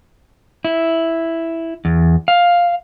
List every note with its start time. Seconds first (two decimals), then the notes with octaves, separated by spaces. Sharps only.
0.65 E4
1.85 E2
2.28 F5